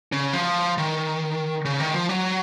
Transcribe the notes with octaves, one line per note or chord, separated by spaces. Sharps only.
C#3
F3
D#3
C#3
D#3
F3
F#3